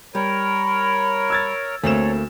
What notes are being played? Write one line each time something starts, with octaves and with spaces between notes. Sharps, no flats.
G3 A#4 C#5 B5
E6 G#6 A6
D2 A3 A#3 C4 A4 C5 C#5 E7